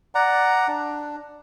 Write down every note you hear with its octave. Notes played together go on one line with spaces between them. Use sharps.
D5 F#5 A#5
D4